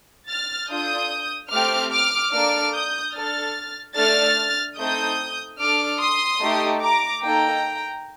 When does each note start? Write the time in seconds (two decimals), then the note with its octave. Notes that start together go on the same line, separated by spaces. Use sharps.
0.29 F6 A6
0.69 D4 F4 A4 D#6 G6
1.51 A3 C4 G4 D6 F6
1.92 D6 F6
2.33 A#3 D4 A4 D6 F6
2.73 D#6 G6
3.14 D4 A4 F6 A6
3.96 A3 D4 A4 F6 A6
4.77 A3 C4 D#4 A4 D#6 G6
5.59 D4 A4 D6 F6
5.99 C6 D#6
6.41 A3 D#4 G4
6.82 A#5 D6
7.22 A#3 D#4 A4 G5 A#5